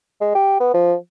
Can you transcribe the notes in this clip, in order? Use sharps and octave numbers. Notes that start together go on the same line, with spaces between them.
G#3
G4
B3
F3